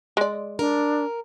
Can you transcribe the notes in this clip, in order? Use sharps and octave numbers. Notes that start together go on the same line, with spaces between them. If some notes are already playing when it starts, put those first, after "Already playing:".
G#3 D5
D4 A#4